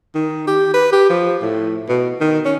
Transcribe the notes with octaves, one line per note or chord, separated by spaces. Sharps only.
D#3
G4
B4
G4
F3
A2
B2
D#3
C#4